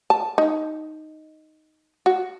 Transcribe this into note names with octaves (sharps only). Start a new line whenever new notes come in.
A5
D#4
F#4